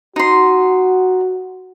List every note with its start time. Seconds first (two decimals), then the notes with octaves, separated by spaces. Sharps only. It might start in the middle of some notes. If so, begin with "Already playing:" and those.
0.16 D#4 F#4 C6